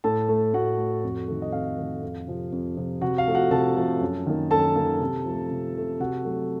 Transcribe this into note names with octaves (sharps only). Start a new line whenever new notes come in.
A2 A4 A5
A3
A2 F#4 F#5
A3
F2
D#3 A3
D#5
F2 F5
D#3 A3
F2
C3 F3
F2
C3 F3
C3 F#4 F#5
F5
F3 A3
F#4 F#5
C3 A4 A5
F3 A3
F#2
D#3 A#3
F#2 A4 A5
D#3 A#3
C3
F3 A3
C3
F3 A3
C3 F#4 F#5
F#3 A3